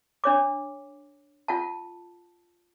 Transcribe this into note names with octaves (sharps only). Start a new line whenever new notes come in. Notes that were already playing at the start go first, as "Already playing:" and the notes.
D4 C#5 D6
F4 F#5 A5